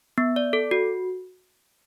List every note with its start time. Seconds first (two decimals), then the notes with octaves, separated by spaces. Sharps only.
0.18 B3
0.36 D5
0.53 A4
0.71 F#4